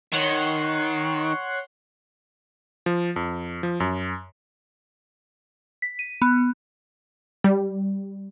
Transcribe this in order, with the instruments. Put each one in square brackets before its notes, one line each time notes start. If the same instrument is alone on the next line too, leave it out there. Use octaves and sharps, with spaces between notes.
[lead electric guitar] D#3 [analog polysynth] C#5 F#5 C6
[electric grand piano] F3
F2
F3
F#2
[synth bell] B6
D#7
B3
[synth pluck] G3